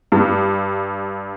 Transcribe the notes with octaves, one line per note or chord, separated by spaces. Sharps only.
G2